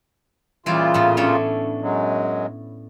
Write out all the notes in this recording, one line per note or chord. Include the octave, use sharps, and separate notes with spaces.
A#2 C#3 E3 G3 F4 D5
A2 B3
A3 C#4 D4
F#2 F#3 G#3